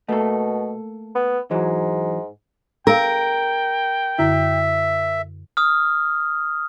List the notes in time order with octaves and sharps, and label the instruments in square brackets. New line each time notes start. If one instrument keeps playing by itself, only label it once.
[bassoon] B2 [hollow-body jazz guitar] A3 A#3 A4
[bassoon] B3
[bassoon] G#2 [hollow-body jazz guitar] E3 F#3
[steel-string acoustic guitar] A#4 [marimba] F5 E6 [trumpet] G5
[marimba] F#2 D3 E4 [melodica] E5
[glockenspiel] D#6 F6